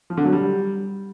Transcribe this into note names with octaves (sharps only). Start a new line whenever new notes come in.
F3
D3
F#3
G3